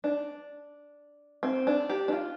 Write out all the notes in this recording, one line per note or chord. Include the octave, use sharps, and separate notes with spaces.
D4
C4
D4
G4
D4
F4